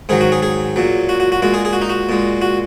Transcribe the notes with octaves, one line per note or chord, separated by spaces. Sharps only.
G#2 D#3 F#3 G#4
F#4
G#4
G#4
A#2 F#3
F#4
F#4
F#4
A#2 G#3 F#4
G#4
G#4
F#4
D#4
F#4
A#2 G#3
F#4